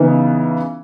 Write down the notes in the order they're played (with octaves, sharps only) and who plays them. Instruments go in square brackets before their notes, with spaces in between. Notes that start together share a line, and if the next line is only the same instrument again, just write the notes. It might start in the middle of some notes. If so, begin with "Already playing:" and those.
Already playing: [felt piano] C#3 E3 B3 D#4